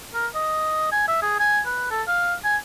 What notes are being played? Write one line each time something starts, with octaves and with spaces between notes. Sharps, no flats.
A#4
D#5
G#5
E5
G#4
G#5
B4
A4
F5
G#5